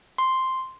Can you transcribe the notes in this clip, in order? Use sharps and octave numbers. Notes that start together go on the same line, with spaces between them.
C6